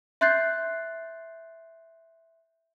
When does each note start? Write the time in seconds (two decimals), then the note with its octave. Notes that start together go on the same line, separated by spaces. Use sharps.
0.21 E5 C6 F#6 G6 A6 C7